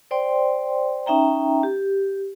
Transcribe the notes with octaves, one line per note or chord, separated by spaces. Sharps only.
C5 D5 G5 C6
C#4 D#4 E5 G5 A#5
G4